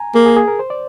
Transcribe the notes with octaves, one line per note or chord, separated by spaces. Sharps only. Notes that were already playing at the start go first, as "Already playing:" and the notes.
Already playing: G#5 A#5
A#3 G#4
G#4
G#4
A#4
C5
D5